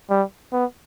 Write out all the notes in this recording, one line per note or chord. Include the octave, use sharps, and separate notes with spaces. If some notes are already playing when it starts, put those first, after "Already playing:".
G3
B3